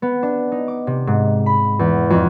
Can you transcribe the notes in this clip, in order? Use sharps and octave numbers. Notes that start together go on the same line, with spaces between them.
B3
D4
D#4
D6
C3
G#2
B5
E2
F2